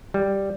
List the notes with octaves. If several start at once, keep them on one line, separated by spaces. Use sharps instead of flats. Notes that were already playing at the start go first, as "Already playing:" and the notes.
G3